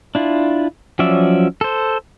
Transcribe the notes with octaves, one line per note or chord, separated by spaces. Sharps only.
D4 E4 F4
F3 F#3 C#4 D5 E5
A4 C5